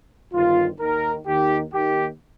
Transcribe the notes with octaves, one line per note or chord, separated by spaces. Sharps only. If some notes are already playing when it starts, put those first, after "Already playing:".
G1 G2 D#3 F4
D#2 D#3 A#4
D#2 D#3 G4
D#2 D#3 G4